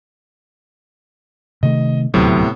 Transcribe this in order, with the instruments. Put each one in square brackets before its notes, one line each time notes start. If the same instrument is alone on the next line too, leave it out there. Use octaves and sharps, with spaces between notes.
[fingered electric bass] C3 D#3 A3 [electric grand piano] D#5
[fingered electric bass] D#1 D2 F#3 [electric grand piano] A2 C3 B3